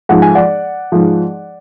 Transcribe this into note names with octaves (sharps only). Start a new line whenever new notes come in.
G#2 F3 F#5
G#5
D5 F#5
G#2 F3